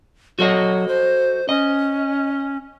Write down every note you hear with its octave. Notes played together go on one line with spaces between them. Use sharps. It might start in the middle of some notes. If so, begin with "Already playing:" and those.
F#3 F#4 A4 D#5
C5
C#4 D#5